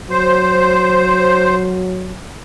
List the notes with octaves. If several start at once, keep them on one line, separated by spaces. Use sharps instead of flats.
F#3 C5